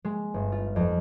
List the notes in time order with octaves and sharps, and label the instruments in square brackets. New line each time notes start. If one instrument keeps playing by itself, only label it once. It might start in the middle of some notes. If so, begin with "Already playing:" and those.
[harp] G#3
G1
F4
F2